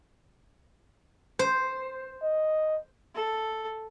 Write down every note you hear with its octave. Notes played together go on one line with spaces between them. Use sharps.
C5
D#5
A4